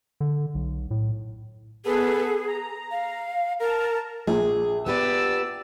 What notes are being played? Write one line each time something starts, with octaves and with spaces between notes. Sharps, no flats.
D3
B1
A2
B3 G#4 A4 B4
A#5
F5
A#4 A5 A#5
A#1 G#4
B3 G4 B4 D5 E6